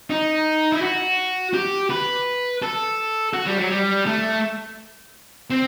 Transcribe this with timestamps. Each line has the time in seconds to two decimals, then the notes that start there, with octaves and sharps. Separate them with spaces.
0.10 D#4
0.72 E4
0.82 F#4
1.54 G4
1.90 B4
2.62 A4
3.34 F#4
3.46 G3
3.58 F#3
3.70 G3
4.06 A3
5.50 C4